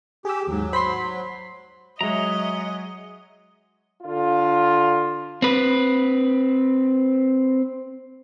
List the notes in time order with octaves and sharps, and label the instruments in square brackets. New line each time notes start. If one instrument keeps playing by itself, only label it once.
[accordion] G4 [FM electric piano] G#4 E6
[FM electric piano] D#2 G#2 [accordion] F#3
[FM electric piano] C5 B6 [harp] B5 C6
[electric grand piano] F#3 G#3 [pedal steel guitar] C#5 A#5 [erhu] D#5 [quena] E5
[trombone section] D3 F4
[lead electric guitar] C4 B4